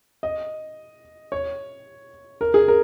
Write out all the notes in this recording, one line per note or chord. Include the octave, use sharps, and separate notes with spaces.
D#5
C#5
A#4
G#4
A#4